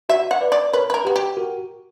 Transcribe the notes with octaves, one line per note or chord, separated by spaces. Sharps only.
F#4 E5
F#5
B4 D5
D5
A#4 B4 C#5
B4
A#4
F#4 G4 B4
G4
F#4 A#4